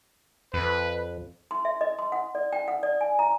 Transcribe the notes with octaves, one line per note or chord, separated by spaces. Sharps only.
F2 B4
C6
E5
D#5
C6
F#5
D5
G5
F#5
D5
G#5
A#5